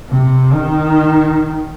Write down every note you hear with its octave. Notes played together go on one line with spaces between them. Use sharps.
C3
D#3